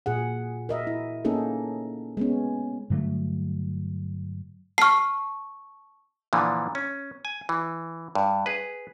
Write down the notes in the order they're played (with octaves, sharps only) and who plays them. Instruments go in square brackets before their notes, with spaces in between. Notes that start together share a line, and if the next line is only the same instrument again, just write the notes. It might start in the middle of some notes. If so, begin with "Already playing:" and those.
[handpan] A#2 G#4 F#5
A#4 D#5 E5
E4
A#3 C#4 D#4 G#4 A4
G#3 B3 C#4
[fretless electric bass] G2 D3 F#3 A3
[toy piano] A5 C#6 [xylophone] F6 C7
[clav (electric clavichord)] A#2 D3 E3 F3
C#4
G#5
E3
G2
G#4 B4